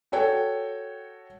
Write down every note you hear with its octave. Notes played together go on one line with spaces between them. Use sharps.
F#4 A4 C#5 G5